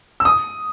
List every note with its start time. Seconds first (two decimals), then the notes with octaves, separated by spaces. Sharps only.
0.20 E6
0.25 D#6